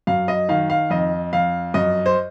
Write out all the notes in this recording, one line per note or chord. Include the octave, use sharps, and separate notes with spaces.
F#2 F5
D#5
D#3 F5
F5
F2 D#5
F2 F5
F#2 D#5
C5